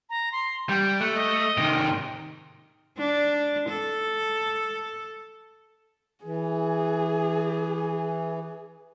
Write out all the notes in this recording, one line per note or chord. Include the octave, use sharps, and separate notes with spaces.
A#5
C6
G3 G6
A3 F#6
D#5
C3 D#3
D4
A4
E3 G#4